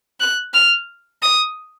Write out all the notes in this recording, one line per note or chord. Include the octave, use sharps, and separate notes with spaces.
F#6
F6
D#6